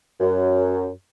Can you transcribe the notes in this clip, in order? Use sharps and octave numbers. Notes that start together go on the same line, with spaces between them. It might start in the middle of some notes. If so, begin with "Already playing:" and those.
F#2